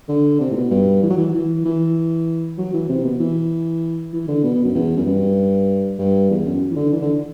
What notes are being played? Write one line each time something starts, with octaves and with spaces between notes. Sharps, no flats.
D3
C3
A2
B2
G2
E3
F#3
E3
E3
E3
F#3
E3
C3
B2
E3
E3
D3
B2
B2
F#2
E2
F#2
G2
G2
E2
F#2
E3
D3
E3
D3